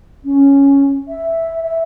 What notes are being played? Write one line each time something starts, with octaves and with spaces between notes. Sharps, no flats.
C#4
E5
E5